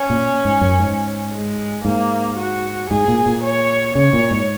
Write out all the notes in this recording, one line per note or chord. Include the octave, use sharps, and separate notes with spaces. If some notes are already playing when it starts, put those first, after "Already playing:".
Already playing: C#4
A#2
G#2
F#2
G#2
G#3
G#2 A#3
F#4
G#2 G#4
A#2
A#2
C#5
C#3 C#5
A#2
G#2